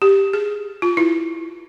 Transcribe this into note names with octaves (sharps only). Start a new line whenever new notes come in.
G4
G#4
F4
E4